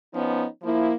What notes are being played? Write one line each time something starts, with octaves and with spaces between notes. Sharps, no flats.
F3 B3 C#4 D#4
F3 A#3 E4